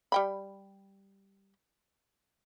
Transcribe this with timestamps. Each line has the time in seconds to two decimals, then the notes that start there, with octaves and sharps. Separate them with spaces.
0.12 G3 G5 B5